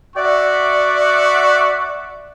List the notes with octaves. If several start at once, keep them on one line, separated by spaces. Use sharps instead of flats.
F#4 D5 E5 F#5 C#6